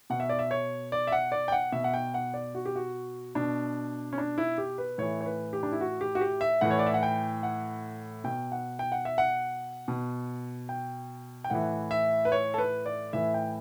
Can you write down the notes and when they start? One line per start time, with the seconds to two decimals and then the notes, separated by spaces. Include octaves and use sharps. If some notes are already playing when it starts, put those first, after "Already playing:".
0.10 B2 F#5
0.20 E5
0.29 D5
0.39 E5
0.51 C#5
0.92 D5
1.07 E5
1.12 F#5
1.32 D5
1.48 G5
1.52 F#5
1.72 B2 E5
1.84 F#5
1.94 G5
2.14 F#5
2.34 D5
2.55 F#4
2.65 G4
2.76 F#4
3.35 B2 D4
4.13 C#4
4.18 D4
4.38 E4
4.58 G4
4.78 B4
4.98 A2 E3 C#5
5.21 C#5
5.26 B4
5.53 G4
5.63 D4
5.72 E4
5.81 F#4
6.01 G4
6.15 F#4
6.21 G4
6.41 E5
6.61 A2 E3 F#5
6.71 C#5
6.79 D5
6.86 E5
6.94 F#5
7.03 G5
7.43 F#5
8.24 B2 G5
8.52 F#5
8.79 G5
8.92 F#5
9.05 E5
9.18 F#5
9.88 B2
10.69 G5
11.44 G5
11.50 A2 E3 F#5
11.91 E5
12.25 B4
12.32 C#5
12.54 A4
12.58 B4
12.86 D5
13.13 A2 E3 E5
13.34 G5